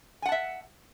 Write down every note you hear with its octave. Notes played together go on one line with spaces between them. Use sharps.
E5 F#5 G#5 A5